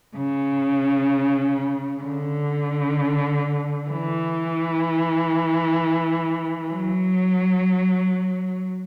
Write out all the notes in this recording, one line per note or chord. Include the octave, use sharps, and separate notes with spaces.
C#3
D3
E3
F#3